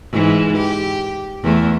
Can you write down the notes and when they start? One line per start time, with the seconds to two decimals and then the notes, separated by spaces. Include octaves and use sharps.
0.11 G#2 E3
0.56 G4
1.44 E2 A3